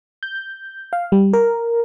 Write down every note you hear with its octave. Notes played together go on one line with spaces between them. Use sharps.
G6
F5
G3
A#4